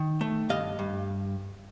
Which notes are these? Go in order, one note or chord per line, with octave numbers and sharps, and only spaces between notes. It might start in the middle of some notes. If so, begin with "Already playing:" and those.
Already playing: D#3
A3
G2 D#5 F5
G2